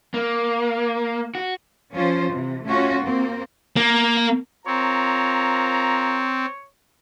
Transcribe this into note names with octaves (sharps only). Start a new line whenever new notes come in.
A#3
F#4
F3 C#4 F4 C5
C3 E3
A3 C#4 F4 F#4
A#3 C4
A#3
C4 F4 A#4 C#5 A#5